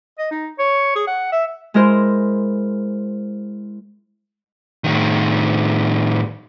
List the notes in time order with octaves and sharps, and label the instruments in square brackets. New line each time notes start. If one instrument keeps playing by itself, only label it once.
[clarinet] D#5
D#4
C#5
G#4
F#5
E5
[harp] G#3 E4 A#4 C5
[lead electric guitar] A2 D#3